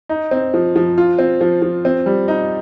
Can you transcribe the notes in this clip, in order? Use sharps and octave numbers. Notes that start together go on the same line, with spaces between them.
D#4
C4
F3
F3
F4
C4
F3
F3
C4
G3
D#4